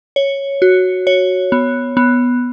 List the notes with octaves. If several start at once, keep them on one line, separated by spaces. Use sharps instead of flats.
C#5
F#4
C#5
B3
B3